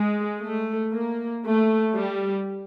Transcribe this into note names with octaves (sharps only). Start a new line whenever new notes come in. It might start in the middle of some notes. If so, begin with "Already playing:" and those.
Already playing: G#3
A3
A#3
A3
G3